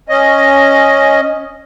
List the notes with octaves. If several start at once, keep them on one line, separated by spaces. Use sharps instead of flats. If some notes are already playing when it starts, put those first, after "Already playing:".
C#4 D#5